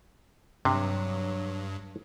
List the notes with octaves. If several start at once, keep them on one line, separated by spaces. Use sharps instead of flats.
G2 C3 F#3